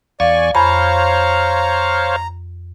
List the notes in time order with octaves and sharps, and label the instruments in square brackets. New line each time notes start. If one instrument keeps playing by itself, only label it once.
[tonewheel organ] E2 G#5 C#6 [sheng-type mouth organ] D5 [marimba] F5
[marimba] F2 B5 [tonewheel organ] C5 C#5 F5 [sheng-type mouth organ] A#5